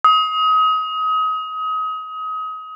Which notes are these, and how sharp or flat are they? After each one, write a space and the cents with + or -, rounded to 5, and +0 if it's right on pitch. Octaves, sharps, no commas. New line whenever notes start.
D#6 +30